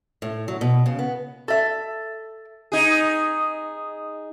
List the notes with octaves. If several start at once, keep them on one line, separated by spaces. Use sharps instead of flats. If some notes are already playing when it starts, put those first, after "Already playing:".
A2
F#3
B2
C#3
B3
A4 E5
D#4 G#4